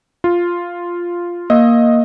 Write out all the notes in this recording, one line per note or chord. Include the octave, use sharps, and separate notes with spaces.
F4
A#3 D#5